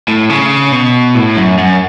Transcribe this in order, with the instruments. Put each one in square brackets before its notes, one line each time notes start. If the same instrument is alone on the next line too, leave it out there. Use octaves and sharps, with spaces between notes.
[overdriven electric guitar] A2
C#3
B2
A2
F#2
F#2